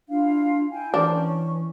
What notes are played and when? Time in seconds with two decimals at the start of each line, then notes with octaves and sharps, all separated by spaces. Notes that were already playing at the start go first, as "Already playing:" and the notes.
0.09 D4 E4 F4 F5
0.71 E4 G5 G#5
0.94 E3 D4 A#4 C5 G5
1.13 C#4